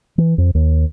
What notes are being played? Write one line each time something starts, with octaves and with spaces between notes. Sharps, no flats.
E3
F2
D#2